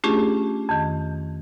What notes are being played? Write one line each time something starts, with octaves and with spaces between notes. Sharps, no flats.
A3 C#4 D4 F4 G4 G#4
F2 D#3